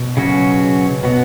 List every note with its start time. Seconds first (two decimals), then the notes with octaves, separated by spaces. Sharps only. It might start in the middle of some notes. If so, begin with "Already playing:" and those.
Already playing: B2
0.17 C#3 F#3 C#4 F#4
1.03 B2 B3 F#4 C#5